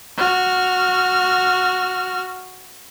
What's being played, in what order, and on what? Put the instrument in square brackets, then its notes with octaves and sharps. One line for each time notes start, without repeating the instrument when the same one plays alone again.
[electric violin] F#4 F6